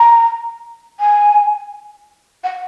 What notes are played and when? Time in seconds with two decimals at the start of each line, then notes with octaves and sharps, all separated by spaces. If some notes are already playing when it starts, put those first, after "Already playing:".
Already playing: A#5
1.00 G#5
2.44 F#5